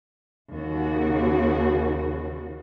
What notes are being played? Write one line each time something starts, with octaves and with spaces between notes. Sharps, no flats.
D#2 C#3 F#4